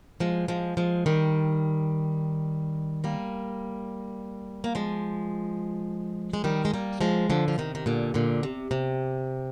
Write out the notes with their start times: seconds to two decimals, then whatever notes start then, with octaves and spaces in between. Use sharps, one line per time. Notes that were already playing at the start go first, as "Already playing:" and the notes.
0.20 F3 G#3
0.48 F3 G#3
0.77 F3 G#3
1.06 D#3 G3
3.04 G3 A#3
4.64 A#3
4.75 F3 G#3
6.33 G#3
6.44 D#3 G3
6.65 G#3
6.74 G3 A#3
7.01 F3 G#3
7.30 D3 F3
7.48 F3
7.58 C3 D#3
7.75 D#3
7.86 A#2 D3
8.14 A#2 D3
8.43 C3
8.71 C3